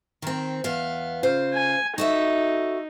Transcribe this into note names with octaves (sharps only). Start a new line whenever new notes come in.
D#3 C4
E2 B3 F5
C#3 F4 C5
G#5
D#4 F#4 A4 E5